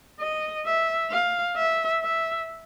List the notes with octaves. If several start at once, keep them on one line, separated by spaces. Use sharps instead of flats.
D#5
E5
F5
E5
E5